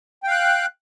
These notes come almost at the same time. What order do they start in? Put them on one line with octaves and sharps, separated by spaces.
G5 F5 F#6